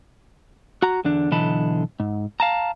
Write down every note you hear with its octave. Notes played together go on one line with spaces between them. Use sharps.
F#4 A#5
E2 D3 D4
B1 D3 E3 D#5 A5 B5
G#2
F5 A5 A#5